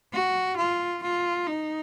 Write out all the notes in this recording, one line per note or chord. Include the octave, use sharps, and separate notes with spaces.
F#4
F4
F4
D#4